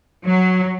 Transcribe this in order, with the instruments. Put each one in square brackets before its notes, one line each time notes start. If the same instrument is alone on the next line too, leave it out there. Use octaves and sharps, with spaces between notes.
[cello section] F#3